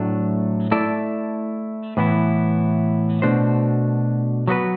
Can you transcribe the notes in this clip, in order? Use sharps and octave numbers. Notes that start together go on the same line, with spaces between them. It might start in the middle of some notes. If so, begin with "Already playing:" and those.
Already playing: A2 F#3 A3 D4
A3 E4 A4 D5
A2 E3 B3 E4
B2 A3 D4 F#4 C5
F#3 B3 F#4 B4